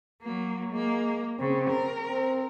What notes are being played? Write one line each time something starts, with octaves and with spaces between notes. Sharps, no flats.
F#3 A#3
G#3 A#3
C#3 C4
A#4
C4